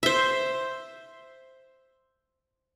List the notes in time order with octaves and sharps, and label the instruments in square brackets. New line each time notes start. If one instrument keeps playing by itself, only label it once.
[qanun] C5 E5